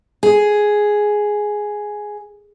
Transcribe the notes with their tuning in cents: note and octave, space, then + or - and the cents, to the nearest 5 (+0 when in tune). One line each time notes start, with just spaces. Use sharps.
G#4 +5